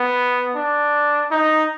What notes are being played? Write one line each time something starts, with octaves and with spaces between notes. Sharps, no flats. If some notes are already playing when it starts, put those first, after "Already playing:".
Already playing: B3
D4
D#4